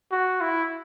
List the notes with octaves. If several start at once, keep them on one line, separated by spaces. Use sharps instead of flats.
F#4
E4